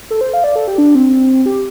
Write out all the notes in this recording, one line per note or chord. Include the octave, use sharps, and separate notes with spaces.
A4
C5
F5
D5
A4
G4
D4
C4
G4